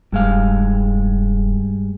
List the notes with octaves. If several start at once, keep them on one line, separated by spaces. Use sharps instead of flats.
E1 G2 G#3 F5